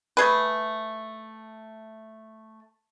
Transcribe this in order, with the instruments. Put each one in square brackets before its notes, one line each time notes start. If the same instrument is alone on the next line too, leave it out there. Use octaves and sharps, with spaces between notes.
[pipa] A3 G#4 B4